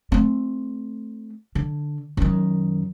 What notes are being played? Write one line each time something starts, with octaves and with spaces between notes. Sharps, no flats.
A3 C4
D3
F#2 D#3